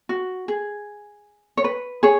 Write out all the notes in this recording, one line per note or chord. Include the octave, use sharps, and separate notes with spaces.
F#4
G#4
C#5
B4
G#4 C#5